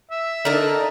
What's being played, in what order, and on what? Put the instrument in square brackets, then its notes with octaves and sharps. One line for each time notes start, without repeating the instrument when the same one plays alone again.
[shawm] E5
[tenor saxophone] D3 [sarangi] D#4 [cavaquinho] A#4 A5